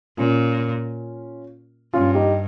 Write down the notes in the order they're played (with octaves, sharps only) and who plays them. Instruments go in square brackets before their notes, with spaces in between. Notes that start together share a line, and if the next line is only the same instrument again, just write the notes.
[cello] A#2 [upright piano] C#4 F4
[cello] G2 [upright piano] C#4 F4
[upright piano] D#4 G4